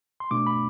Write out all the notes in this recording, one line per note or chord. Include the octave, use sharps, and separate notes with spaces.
C6
B2 A3 D4 D6
B5